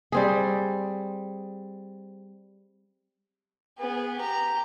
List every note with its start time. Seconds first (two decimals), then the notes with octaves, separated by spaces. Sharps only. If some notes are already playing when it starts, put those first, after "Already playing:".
0.12 G3 C4 G#4
3.79 B3 G#4
4.17 G4 A#5